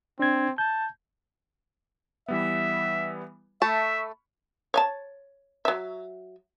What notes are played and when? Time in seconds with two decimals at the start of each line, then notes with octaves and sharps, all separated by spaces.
0.19 C4 D4 G#6
0.58 A5 G6
2.28 E3 G3 B3 E5
3.62 A3 E5 A5 B5 C#6
4.74 C#5 G#5 A5
5.65 F#3 E5